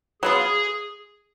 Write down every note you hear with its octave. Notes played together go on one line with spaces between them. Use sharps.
F#3 B3 F4 G#4